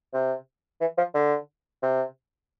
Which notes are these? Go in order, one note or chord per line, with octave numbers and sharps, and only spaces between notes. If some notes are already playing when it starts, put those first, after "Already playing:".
C3
E3
F3
D3
C3